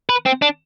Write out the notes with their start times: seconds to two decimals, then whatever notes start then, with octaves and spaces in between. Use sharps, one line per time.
0.09 B4
0.26 C4
0.42 D4